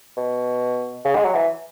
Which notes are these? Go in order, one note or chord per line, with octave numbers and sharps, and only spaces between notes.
B2
C#3
G#3
F#3
E3